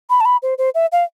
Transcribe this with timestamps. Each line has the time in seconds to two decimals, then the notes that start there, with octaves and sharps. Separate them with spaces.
0.10 B5
0.20 A5
0.25 B5
0.42 C5
0.58 C5
0.75 E5
0.92 F5